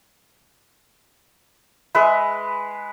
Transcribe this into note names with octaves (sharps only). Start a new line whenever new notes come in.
G#3 B4 E5